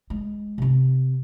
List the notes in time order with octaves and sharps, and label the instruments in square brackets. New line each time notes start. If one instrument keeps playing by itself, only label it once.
[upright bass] G#3
C3 C4